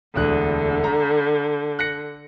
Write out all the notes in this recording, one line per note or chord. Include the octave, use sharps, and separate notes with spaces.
E1 D2 D3 F#6
A#5
F#6 A#6 C#7